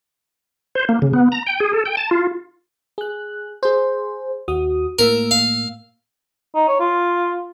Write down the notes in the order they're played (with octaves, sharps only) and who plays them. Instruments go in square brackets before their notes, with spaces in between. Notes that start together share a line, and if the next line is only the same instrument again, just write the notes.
[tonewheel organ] C5
A#3
C#3
B3
A#5
G5
G#4
A4
G5
A5
F4
[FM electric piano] G#4 F#6
G#4 C5
D#2 F#4 D#6
[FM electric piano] A2 A#3 E6 [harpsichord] A#4
[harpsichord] F5
[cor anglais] D#4
C#5
F4